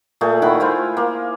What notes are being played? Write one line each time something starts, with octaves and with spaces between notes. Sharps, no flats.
A#2 A3 G#4
D#3 E4 F#5 B5
E4 F4 C5 G#5
A#3